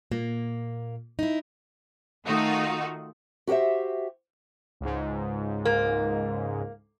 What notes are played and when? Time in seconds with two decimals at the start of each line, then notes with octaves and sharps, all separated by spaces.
0.12 A#2 A#3
1.19 D#4 E4
2.25 D#3 A3 D#4 F4 F#4
3.47 F#4 G4 B4 C5 E5
4.81 C#2 G#2
5.65 A#3